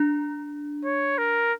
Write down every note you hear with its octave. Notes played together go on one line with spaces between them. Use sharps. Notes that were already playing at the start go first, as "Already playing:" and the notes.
Already playing: D4
C#5
A#4